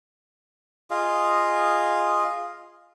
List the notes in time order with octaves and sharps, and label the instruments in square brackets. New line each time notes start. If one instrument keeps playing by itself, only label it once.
[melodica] F4 G#4 D#5 F5